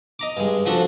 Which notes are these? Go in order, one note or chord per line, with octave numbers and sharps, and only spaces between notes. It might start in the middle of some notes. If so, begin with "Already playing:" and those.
D#5 A#5 D6
G2 G#3
F3 D4 F#4 A4